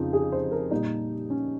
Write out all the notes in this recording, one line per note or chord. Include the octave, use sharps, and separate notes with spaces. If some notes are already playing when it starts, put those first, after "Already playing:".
Already playing: F2 C#3 F3 D#4 F4
G#4
C5
A#4
A#2 G3 D#4
C#4